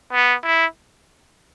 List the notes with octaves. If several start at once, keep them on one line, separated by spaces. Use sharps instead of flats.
B3
E4